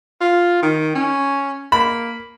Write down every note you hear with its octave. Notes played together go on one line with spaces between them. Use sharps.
F4
D#3
C#4
A#3 B5